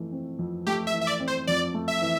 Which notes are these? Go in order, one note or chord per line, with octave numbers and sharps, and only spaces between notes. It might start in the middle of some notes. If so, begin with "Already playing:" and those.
Already playing: F2 E3 A3
C4
F2
A3 G4
E5
E3
E5
D5
C4
C5
F2 D5
A3
E5
E3